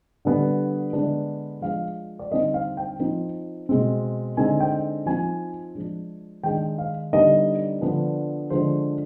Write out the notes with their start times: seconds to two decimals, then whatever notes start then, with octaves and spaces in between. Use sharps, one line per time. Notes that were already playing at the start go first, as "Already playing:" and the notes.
0.25 D3 G3 B3
0.93 D3 G#3 B3 D4
1.62 F3 G#3 D4 F5
2.19 D5
2.32 D3 G3 C4 D#4 D#5
2.54 F5
2.77 G5
3.00 F3 C4 D#4
3.69 B2 G#3 C4
4.37 D3 G#3 C4 D#4 G#5
4.60 G5
5.06 F3 C4 D#4 G#5
5.75 F3 G#3 D4
6.43 D#3 G#3 D4 G5
6.78 F5
7.13 D3 G3 B3 D#4 D#5
7.81 D3 F3 B3 D4
8.50 D3 F3 G#3 C5